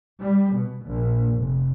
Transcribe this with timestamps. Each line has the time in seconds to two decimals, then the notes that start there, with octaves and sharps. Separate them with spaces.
0.21 G3
0.53 B2
0.85 A#1
1.37 F1